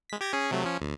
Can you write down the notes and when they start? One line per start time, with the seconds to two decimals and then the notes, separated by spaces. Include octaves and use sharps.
0.10 G#3 B6
0.21 G4 G#6 A#6
0.33 C#4 G#4
0.51 C3 F#3 A3
0.64 F3 C#4
0.81 D2